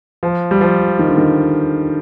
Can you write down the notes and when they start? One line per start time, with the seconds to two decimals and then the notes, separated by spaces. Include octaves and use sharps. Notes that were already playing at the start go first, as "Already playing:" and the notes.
0.23 F3
0.51 G3
0.61 F3
0.99 D#3
1.08 D3
1.18 D#3